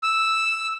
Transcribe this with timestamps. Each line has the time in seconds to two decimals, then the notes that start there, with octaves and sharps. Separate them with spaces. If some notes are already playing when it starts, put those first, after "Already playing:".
0.03 E6